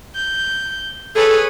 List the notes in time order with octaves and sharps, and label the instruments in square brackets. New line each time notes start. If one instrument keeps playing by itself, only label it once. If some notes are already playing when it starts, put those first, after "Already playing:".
[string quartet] G6
[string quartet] G#4 B4 C#5 [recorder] A4